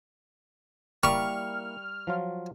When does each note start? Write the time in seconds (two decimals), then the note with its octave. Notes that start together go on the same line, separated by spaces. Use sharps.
1.03 G3 A#3 E4 A#4 C#6 F6
2.07 F3 F#3 F4